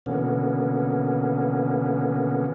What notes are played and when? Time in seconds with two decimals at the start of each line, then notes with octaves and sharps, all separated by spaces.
0.06 B2 D3 E3 A#3 B3 C#4